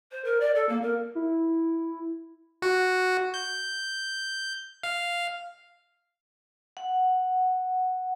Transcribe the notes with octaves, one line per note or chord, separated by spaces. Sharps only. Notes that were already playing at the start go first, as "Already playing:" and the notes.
C5
A#4
D5
A4
A#3
A#4
E4
F#4
G6
F5
F#5